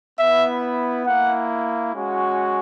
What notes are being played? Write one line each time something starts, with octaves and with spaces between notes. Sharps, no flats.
B3 E4 E5
A#3 E4 F#5
G#3 C#4 F#4